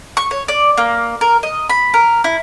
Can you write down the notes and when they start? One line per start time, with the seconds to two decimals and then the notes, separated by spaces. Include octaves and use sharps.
0.17 C#6
0.31 C#5
0.48 D5
0.77 A#3
1.21 A#4
1.43 D#5
1.70 B5
1.94 A#4
2.24 E4